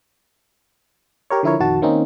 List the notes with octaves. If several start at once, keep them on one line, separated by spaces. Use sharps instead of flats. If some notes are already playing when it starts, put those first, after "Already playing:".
G4 A#4 C#5
D3 F3 E4 A#4 C#5
A#1 F2 D#3 F#4 A5
D#3 A#3 C4 C#4 D#4